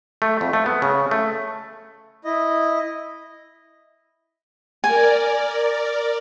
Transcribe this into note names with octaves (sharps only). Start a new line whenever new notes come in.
A3
F2
A3
B3
C#3
A3
E4 D#5
A#4 D5 G#5